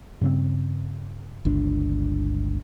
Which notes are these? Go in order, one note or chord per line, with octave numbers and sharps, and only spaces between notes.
G2 C#3 C4
G1 C#2 D4